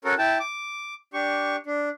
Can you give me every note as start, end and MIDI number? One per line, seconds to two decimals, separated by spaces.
0.04 0.14 61
0.04 0.14 66
0.04 0.14 69
0.04 0.14 70
0.18 0.38 64
0.18 0.38 79
0.18 0.38 81
0.40 0.94 86
1.14 1.56 62
1.14 1.56 67
1.14 1.56 85
1.66 1.89 62